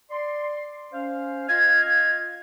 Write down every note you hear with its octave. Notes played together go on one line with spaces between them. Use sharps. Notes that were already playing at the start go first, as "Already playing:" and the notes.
D5 C6
C#4 C5 F5
F4 D#5 F5 G#6